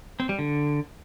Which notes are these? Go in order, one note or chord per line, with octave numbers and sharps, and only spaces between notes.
C4
G3
D3